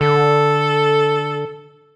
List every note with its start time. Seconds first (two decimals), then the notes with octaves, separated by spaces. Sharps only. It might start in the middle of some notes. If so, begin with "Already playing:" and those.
0.01 D3 A4